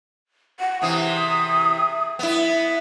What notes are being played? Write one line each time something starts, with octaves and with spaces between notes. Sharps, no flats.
F#5
C3 E3 D#6
B3 E4